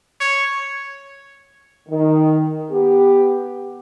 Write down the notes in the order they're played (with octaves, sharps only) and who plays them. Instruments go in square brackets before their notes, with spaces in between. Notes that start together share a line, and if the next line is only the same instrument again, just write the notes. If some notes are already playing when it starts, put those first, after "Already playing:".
[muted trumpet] C#5
[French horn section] D#3
B3 G4